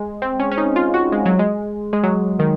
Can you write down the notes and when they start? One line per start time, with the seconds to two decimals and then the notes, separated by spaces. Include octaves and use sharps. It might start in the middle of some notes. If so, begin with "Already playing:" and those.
Already playing: G#3
0.22 C4
0.40 C#4
0.51 C#4
0.58 D#4
0.76 F4
0.94 F#4
1.12 G#3
1.26 F#3
1.39 G#3
1.93 G#3
2.03 F#3
2.39 D#3